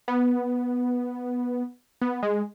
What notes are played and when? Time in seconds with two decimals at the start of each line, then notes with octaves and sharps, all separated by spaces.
0.08 B3
2.02 B3
2.23 G#3